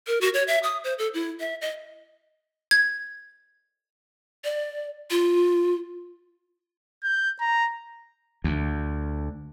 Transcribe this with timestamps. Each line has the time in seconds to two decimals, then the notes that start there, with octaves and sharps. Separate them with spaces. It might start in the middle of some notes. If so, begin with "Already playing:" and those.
0.07 A#4
0.21 F#4
0.34 C#5
0.48 E5
0.63 D#6
0.84 C5
0.98 A4
1.14 E4
1.40 E5
1.61 D#5
2.71 G#6
4.44 D5
5.10 F4
7.04 G6
7.41 A#5
8.44 D2